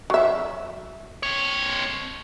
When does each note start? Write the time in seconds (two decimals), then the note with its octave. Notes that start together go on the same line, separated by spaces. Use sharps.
0.10 F#3 E5
1.23 C4 C#5